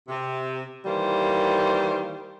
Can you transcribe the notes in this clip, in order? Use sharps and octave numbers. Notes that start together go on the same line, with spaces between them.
C3
D#3 E3 G3 A#3 C5